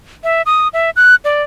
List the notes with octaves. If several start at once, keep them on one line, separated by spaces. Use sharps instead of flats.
E5
D#6
E5
F#6
D5